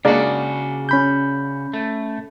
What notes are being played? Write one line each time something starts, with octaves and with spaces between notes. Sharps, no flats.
C#3 G#3 A#3 D4 F#4
C#4 B5 G6
A3